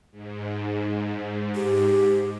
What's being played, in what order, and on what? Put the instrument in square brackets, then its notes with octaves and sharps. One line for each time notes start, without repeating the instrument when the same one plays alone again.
[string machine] G#2
[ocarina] G4